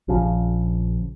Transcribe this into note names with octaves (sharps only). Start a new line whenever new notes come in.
A#1 C#3 F3